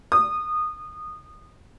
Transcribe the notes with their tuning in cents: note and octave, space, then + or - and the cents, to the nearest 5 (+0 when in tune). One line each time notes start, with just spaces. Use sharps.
D#6 -20